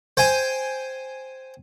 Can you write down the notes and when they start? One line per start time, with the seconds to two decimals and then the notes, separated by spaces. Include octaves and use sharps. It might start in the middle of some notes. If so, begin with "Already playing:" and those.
0.17 C5 G5 G#5